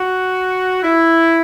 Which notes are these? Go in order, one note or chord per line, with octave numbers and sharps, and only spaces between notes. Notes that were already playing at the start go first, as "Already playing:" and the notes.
Already playing: F#4
E4